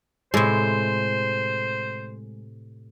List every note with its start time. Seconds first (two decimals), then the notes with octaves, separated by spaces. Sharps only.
0.34 A2 C3 G#3 C5